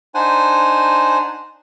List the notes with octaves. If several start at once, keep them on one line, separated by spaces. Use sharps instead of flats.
D4 D#4 C5 F#5 G#5